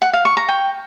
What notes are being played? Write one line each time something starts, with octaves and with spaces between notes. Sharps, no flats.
F#5
F5
C#6
A#5
G5